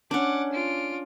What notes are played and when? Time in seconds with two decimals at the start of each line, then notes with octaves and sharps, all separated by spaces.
0.11 C#4 D4 F#5 D6
0.53 F4 D7